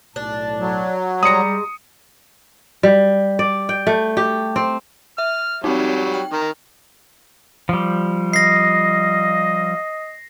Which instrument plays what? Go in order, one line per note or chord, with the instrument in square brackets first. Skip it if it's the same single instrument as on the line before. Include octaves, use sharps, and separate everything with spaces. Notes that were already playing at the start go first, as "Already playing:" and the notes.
[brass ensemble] B1 A2 A5 [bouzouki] D4
[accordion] F#3
[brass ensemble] G3 [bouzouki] G#3 A#5 [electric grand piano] D#6 C#7
[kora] G3
D5
G5
A3
G4
C4
[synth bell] E5 [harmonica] F6
[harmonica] F#3 G3 [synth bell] C4 D#4
[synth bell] G5
[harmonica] D#3 A#4
[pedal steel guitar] F3 G3
[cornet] D#5 [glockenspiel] A#6 C7